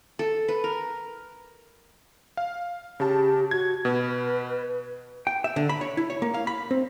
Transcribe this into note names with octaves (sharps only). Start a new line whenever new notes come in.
A4
B4
A#4
F5
C#3 G4 A5
F#4 G#6
B2 B4
G5
E5
D3
B5
C#5
E4
C#5
A#3
F5
B5
C4